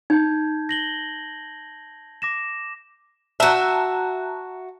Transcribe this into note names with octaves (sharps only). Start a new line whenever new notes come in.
D#4 A5 G6 G#6
A#6 F#7 G7
D6 A#6 E7
F#4 E5 A5 A#5 F#6